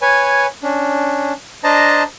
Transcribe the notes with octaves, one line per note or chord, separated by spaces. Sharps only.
B4 C#5 G#5
C#4 D4
D4 C5 D#5 A5 A#5